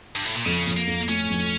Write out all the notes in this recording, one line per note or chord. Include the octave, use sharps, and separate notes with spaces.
G2
A2
A#2
F2 C#3
F2
A#3
F2
A3 C#4
F2